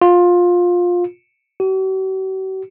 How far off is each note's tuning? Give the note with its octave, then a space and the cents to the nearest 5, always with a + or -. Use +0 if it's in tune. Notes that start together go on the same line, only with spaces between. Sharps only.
F4 +20
F#4 +45